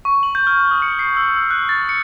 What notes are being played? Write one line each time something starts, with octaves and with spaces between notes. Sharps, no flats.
C#6
F#7
G6
F6
D#6
C#7
C7
E6
E6
F#6
A6
C#7